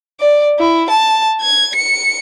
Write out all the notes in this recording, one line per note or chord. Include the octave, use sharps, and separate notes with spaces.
D5
E4
A5
G#6
C#7